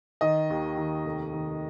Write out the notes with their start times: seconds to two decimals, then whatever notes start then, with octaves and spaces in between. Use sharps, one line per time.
0.21 D#3 D#5
0.50 D#2
0.77 D#3
1.05 F1
1.33 D#3